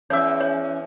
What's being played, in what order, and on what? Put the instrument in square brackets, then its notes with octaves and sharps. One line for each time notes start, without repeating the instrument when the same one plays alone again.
[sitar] E2 E5 [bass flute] C#4 [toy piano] C#5 E6
[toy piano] C#5